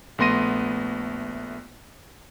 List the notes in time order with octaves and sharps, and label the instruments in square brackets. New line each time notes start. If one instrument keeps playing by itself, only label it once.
[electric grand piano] A#1 A3 B3 C6 A#6 D#7